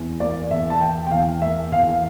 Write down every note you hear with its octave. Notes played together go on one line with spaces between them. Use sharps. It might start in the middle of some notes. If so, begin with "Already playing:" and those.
Already playing: E2
A#3 D5
E2 E5
A5
E3 G5
G5
E2 F5
A#3 E5
E2 F5
F5